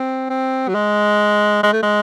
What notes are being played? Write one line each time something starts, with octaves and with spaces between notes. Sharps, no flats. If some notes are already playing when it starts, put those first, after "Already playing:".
Already playing: C4
C4
F#3
G#3
G#3
A3
G#3